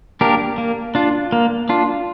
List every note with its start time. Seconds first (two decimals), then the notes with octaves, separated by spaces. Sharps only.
0.21 A#3 D4 G4 A#4
0.58 A#3
0.95 D4 F4
1.33 A#3
1.69 D4 F4